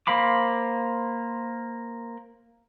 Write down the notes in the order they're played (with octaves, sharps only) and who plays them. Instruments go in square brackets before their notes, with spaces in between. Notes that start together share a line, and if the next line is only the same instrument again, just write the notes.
[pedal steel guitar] A#3 C5 F5 B5 D6